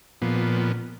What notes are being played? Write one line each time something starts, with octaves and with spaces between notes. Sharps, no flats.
A#2 F3 B3